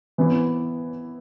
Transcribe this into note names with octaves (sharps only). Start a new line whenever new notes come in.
E3 B3 E4